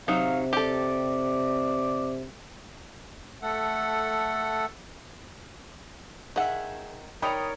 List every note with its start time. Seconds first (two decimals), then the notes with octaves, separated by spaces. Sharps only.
0.08 C3 F#3 D#4 F5
0.53 G4 A4 D5
3.42 A3 A4 F#5
6.36 D#3 G#4 E5 F#5
7.22 D#4 A#4 C#5 D5 G5 A#5 B5 D#6